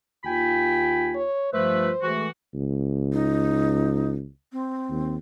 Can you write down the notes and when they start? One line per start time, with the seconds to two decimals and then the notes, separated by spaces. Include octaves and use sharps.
0.24 D#2 F4 G5 G#5 B5
1.15 C#5
1.53 G2 F3 A3 B4 C5 E5
2.03 E3 G#3 A3 F#4
2.54 C#2
3.13 D#4
4.52 C4
4.90 D#2